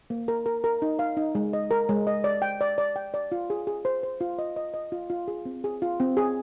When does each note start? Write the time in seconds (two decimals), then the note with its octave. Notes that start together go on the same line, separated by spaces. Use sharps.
0.10 A#3
0.28 A#4
0.46 A#4
0.64 A#4
0.82 D#4
0.99 F5
1.17 D#4
1.35 G#3
1.53 D#5
1.71 A#4
1.89 G#3
2.07 D#5
2.24 D5
2.42 G5
2.61 D5
2.78 D5
2.96 G5
3.14 D5
3.32 F4
3.50 G#4
3.67 G#4
3.85 C5
4.03 C5
4.21 F4
4.39 D#5
4.56 D#5
4.74 D#5
4.92 F4
5.10 F4
5.28 G#4
5.45 C4
5.64 G#4
5.82 F4
6.00 C4
6.17 G#4